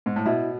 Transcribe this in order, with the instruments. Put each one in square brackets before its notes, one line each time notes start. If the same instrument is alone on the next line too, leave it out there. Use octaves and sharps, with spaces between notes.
[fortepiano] G#2
A2
[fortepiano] B2 [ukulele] E4